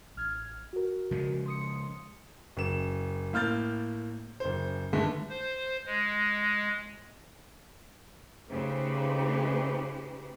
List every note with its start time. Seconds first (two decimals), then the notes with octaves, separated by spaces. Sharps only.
0.16 A1 F6 G#6
0.73 F#4 A#4
1.11 C#3 F3 G#3
1.46 C6 D#6 C#7
2.57 F#1 E7
3.33 A2 A#3 F6 G6 A6
4.40 F#1 C5
4.93 G2 D3 D#3 G#3 A3
5.30 C5
5.86 G#3
8.50 C#3 A3 D#4 G4 B4 C5